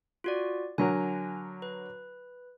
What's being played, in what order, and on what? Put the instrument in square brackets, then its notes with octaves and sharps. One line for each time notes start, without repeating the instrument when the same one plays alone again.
[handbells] F4 F#4 D5
[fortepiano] D3 F#3 A#4 [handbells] G#5
[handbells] B4